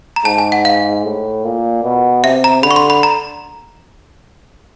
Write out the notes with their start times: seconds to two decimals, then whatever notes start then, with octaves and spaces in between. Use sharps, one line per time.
0.16 A#5
0.25 G#2 A5
0.38 G#5
0.52 F#5
0.65 F5
1.05 A2
1.44 A#2
1.84 B2
2.23 C3 E5
2.44 A#5
2.63 D3 B5
2.71 C#6
2.76 C6
2.90 B5
3.03 A#5